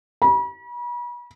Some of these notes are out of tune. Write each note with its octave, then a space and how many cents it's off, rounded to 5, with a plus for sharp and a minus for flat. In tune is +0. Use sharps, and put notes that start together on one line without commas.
B5 -40